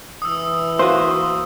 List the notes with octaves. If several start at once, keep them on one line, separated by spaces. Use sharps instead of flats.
E3 D#6 E6
A#3 F#4 B4 C5